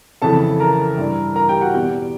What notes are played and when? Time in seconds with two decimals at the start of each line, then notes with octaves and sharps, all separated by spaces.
0.22 F2 C#3 E3 A4 A5
0.60 A#4 A#5
0.98 G2 E3
1.36 A#4 A#5
1.49 G4 G5
1.61 F#4 F#5
1.74 E2 B2 G4 G5